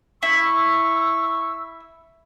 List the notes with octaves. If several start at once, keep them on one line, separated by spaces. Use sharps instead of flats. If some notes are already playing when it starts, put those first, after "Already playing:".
E4 C#6 E6